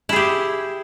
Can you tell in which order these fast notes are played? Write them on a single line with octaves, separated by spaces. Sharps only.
E4 G#4 G4